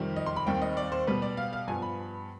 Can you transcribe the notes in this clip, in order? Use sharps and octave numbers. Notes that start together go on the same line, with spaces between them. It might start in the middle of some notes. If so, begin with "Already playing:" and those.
Already playing: F2 C3 D#3 G3 C4
D#5
C6
B5
D#2 D#3 G3 C4 G5
D#5
D5
C5
B2 G3 B3 B4
D5
F5
F5
G2 F3 B3 G#5
B5